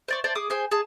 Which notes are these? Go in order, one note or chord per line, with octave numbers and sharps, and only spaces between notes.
C5 D5 C#6
C5 D5 A5
G#4 D6 D#6
G#4 C5 G5 G#5
G#4 A5